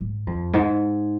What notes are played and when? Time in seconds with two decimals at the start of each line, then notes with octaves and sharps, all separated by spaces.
0.01 G#2
0.27 F2
0.53 G#2